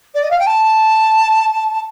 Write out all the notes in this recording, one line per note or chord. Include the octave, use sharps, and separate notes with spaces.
D5
D#5
F5
G5
A5